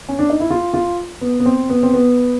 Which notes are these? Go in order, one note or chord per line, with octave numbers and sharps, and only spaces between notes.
C#4
D4
D#4
E4
F4
F4
B3
B3
C4
B3
C4
B3